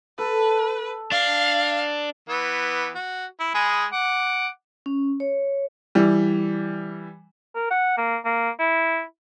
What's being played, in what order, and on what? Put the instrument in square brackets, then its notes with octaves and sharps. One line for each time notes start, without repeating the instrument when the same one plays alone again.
[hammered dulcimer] A4 [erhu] B4
[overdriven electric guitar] D4 [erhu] F5
[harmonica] E3 B3
F#4
E4
G#3 G#4 B5
F#5 D6
[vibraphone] C#4
C#5
[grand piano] E3 G3
[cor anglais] A#4
F#5
A#3
A#3
E4